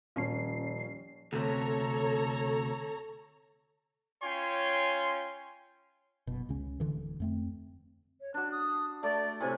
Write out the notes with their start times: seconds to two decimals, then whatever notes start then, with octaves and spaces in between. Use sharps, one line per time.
0.16 D#1 F3 C#4 C7
1.33 D2 C3 A4 C#5 A#5
4.22 C#4 F4 C#5 G5 G#5 C6
6.27 F#1 B2
6.49 C#2 C#3 C#4
6.80 D1 D3 E3
7.20 F2 A3 C4
8.21 C#5
8.34 D4 F#4 F#6
8.52 D#6
9.03 A3 D5 D6
9.40 A2 C3 G#5